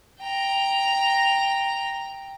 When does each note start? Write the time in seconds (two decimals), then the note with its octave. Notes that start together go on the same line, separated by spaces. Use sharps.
0.20 G5 A#5